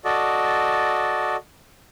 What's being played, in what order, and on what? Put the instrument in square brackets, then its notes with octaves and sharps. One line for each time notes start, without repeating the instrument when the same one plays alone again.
[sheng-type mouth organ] F#4 A4 D5 D#5